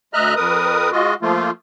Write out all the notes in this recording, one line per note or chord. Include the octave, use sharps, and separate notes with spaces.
D2 D#5 E5 A#5 F6 F#6
F2 A#4 B4 D#6
G#3 F4 F#4 D#5
F3 A3 A#3 F4